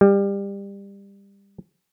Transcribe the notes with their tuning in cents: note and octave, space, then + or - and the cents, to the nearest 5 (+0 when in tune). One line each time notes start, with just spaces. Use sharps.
G3 +25